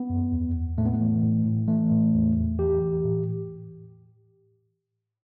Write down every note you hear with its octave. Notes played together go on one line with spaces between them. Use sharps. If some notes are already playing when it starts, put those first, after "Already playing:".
Already playing: B3
F#2
E2
E2
A2 A3
B3
A3
E3
A2
A2
E3 A3
A2
E2
E2
E3 G4
E3
A2